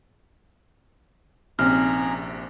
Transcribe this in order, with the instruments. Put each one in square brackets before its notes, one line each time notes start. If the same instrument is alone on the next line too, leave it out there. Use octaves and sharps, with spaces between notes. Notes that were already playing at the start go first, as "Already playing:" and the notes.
[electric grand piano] A#1 C3 [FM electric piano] C4 C#4 D#4 [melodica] G#4 A#5 [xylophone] F6